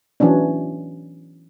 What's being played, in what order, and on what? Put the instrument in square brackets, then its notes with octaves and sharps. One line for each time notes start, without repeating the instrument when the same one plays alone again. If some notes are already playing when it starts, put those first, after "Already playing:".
[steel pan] E3 F#3 C#4 D4